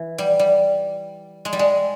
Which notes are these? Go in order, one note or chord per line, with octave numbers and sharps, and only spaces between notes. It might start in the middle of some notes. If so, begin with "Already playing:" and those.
Already playing: E3
G3
G3
G#3
G3
G#3